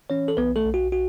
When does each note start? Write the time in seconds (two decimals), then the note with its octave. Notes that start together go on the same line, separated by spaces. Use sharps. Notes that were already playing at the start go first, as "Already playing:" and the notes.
0.10 E3 C#4 C#5
0.28 A4
0.37 B1 B3 B4
0.56 A3 A4
0.66 B1
0.74 F#4
0.92 F#4